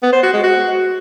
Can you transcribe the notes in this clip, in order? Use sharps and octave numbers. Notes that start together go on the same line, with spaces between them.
B3
C5
F#4
G#3
F#4